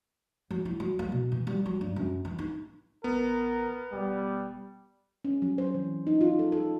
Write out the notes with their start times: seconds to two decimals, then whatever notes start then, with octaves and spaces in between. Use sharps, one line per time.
0.51 F#3
0.65 E4
0.80 F#3
0.99 A#3
1.12 B2
1.32 E3
1.47 G3
1.66 F#3
1.81 G2
1.96 F#2
2.25 E3
2.39 D#4
3.04 A1 B3 A#4
3.93 E1 G3
5.25 C#4
5.42 F#3
5.58 C5
5.75 E3
6.07 D#4
6.21 F4
6.39 A4
6.52 A4